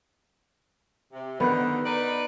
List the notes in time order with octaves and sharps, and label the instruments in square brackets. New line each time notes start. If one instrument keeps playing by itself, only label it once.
[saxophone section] C3
[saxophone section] D3 D#3 [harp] B3 F#6
[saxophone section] D#4 B4 D5